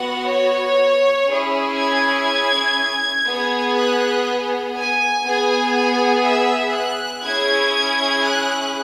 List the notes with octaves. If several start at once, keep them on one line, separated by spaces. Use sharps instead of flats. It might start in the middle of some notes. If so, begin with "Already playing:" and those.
Already playing: B3 F#4 F#5
C#5
C#4 E4 G#4
G#6
B3 G#4
F#6
G#5
B3 G#4
G#5
E5
F#6
C#4 E4 G#4 G#6
F#6